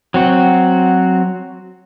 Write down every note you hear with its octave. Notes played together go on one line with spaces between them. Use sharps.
F#3 C4 F#4